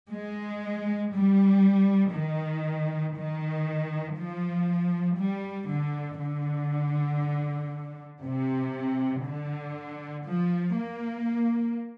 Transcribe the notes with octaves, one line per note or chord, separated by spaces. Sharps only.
G#3
G3
D#3
D#3
F3
G3
D3
D3
C3
D3
F3
A#3